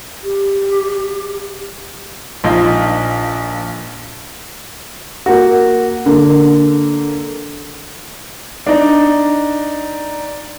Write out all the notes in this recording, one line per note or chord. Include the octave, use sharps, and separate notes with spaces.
G4
A#1 D#4 F4
A#3 F#4
D3 A#3
D4 D#4